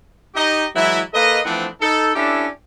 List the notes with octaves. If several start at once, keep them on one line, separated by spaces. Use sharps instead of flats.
D#4 G4 D#5
E3 F#3 G#3 E4
A#3 A4 B4 D#5
E3 F3 A3 B3 C4 D4
D#4 A4
C#4 D4 E4 G4 A4